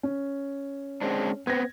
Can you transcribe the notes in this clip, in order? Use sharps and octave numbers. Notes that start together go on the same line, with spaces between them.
C#4
G#3 C4 D4
B3 C4 G#6 A#6